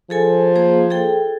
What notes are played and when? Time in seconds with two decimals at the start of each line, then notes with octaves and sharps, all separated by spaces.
0.10 F3 G#4 A4 G#5
0.56 A#3 G#4 C5
0.90 G#4 A4 G5